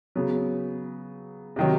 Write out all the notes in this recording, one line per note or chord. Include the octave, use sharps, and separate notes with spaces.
C#3 F#3 B3
C3 D#3 F#3